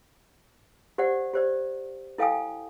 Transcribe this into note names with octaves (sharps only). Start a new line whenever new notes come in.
G4 C5 D5 F#5
G4 C5 D5
E4 A4 F5 G5 G#5 D#6